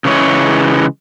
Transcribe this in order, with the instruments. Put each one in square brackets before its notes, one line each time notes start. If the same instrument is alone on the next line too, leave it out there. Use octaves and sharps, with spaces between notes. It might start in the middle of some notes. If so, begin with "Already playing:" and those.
[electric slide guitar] C#3 E3 G#3 C#5